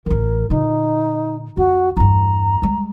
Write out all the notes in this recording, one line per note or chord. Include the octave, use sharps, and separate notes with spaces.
A1 E3 A#4
A#2 D3 D#4
F2 F#4
E2 G2 A#5
G3 G#3